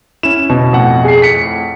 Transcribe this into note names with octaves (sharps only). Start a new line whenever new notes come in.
C#4 E4 E7
B2
F2 A2 F#5
G#4 C7
B6 C#7